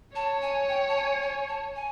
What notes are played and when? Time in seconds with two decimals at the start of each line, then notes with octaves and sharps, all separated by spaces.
0.15 C#5 A5
0.42 G#5
0.69 G5
0.89 A5
0.95 G#5
1.22 G#5
1.48 A5
1.76 G#5